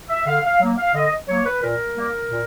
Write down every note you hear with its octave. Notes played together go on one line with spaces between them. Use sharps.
E5
D3 F5
F5
F#3 A#3
F5
D3 D#5
F#3 A#3 C#5
B4
A#2 A#4
G3 A#3
A#2